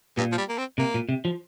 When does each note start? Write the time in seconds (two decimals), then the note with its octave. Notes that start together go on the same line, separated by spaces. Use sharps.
0.17 G2 A#2
0.32 F3
0.38 G3
0.49 A#3
0.58 C4
0.78 C3 A#3
0.94 A#2
1.09 C3
1.25 F3